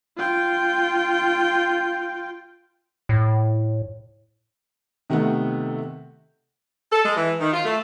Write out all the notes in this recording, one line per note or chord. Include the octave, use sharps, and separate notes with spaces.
F4 G5
A2
C3 D#3 A3 B3 F#5
A4
G#3
E3
D#3
F4
A3